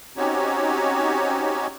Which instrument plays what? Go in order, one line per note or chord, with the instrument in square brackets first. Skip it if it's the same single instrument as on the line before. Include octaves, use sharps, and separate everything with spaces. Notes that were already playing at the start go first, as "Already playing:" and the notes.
[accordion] C4 C#4 D#4 F#4 G4 C#5